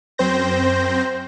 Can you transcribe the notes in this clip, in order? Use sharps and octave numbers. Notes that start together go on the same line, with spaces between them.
F#2 C4 C5 G6 A#6